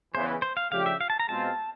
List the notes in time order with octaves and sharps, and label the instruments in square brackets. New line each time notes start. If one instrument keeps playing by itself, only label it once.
[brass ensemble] E2 C#3 E3 [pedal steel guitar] C5
[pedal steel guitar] C5
F5
[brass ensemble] C#3 F3 A3 D4 G4 [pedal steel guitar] F5
[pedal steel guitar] E5
F5
A5
A#5
[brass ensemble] B2 G#3 C4 F4 [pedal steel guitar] A5